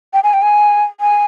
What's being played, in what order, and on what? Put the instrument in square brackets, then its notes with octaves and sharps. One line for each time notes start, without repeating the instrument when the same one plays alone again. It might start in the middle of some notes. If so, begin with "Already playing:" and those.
[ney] G5
G#5
G5
G#5
G#5